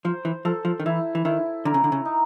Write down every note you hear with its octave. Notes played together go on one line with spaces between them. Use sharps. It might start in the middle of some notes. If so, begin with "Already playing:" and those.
F3 C5
E3
F3 A4
F3
D#3
E3 E4
E3
D#3 E4
D3 A#4
C#3
D3
C#3
D#4